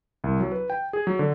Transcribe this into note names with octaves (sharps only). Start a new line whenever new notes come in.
C2
F#3
B4
G5
G#4
F#3
D3